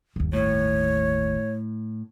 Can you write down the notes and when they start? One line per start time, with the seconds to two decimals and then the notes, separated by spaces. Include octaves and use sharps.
0.16 G1 D#2
0.33 A2 C#5